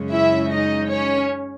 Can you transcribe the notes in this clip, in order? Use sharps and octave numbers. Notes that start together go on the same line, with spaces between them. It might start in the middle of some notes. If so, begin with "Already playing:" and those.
Already playing: F#2 C#3 G#3 C#4
E4 E5
D#4 D#5
C#4 C#5